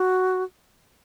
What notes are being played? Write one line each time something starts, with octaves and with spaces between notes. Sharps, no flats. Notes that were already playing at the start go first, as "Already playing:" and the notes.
Already playing: F#4